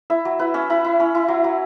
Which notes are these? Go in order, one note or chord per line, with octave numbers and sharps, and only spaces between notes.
E4 E5
F#3
E4 B4
C#4 E5
E4 B5
E4
C#4 B5
E4
F#3
F#3